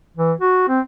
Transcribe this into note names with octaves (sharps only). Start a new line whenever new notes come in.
E3
F#4
C4